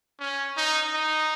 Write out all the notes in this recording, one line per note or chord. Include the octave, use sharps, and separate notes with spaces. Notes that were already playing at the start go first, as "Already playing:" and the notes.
C#4
D#4
D#4